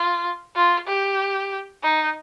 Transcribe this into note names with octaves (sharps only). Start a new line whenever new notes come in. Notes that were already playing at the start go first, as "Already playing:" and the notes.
Already playing: F4
F4
G4
D#4